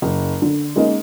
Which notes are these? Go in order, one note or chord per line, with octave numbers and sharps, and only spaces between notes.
F#1
D3
G#3 A#3 C#4 D#4